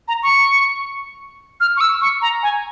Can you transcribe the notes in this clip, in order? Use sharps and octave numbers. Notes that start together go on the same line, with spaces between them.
A#5
C#6
F6
C#6
E6
C#6
A#5
G#5